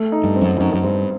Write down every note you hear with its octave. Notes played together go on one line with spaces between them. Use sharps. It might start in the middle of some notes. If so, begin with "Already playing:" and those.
Already playing: A3
D#4
G2
C4
F#2
F#2 D#4
F#2
G2 C4